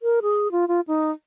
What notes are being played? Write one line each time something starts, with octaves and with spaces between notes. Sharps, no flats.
A#4
G#4
F4
F4
D#4